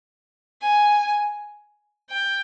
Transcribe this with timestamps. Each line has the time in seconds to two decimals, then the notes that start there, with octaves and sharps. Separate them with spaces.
0.62 G#5
2.10 G5